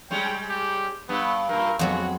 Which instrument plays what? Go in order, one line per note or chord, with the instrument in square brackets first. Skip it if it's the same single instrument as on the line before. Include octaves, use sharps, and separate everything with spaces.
[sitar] G3 G#3 C#4 [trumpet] G5
[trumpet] G4
[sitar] G2 [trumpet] B3
[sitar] G2 A#2 [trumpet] A#4
[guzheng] F2 F#3 B3 [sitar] G#3 [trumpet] F#4